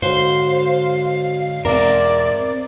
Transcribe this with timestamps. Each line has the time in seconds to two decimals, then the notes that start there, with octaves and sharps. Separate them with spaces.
0.02 G#2 D3 F#4 C5 C#5 F5
1.65 E2 G#2 B2 C4 A#4 D5 E5